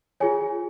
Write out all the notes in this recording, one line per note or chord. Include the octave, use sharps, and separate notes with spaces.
F4 G#4 C#5 G#5